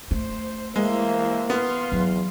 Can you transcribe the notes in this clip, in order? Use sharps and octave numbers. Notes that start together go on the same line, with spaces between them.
A3 C5
E3 G#3 A#3 C5 E5
B3 F5 C6
E2 F#3